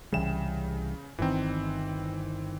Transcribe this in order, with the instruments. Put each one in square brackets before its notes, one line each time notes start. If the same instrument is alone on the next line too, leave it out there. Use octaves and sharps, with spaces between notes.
[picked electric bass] C2 E3 G3 [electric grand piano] C#3 E7
[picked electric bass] G1 D#3 [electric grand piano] E3 C4